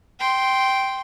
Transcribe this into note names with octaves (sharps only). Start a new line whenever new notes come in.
G5 C6